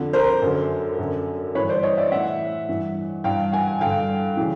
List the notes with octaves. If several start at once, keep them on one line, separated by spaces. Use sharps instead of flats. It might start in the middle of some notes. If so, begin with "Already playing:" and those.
Already playing: F2 D3
A#4 C5
F#2 D3
F#2 D3
G2 E3 B4 C#5
C5 D5
C#5 D#5
D5 E5
A2 E3 E5 F#5
G2 E3
G2 E3 F5 G5
F#5 G#5
G2 D3 F5 G5
C#3 E3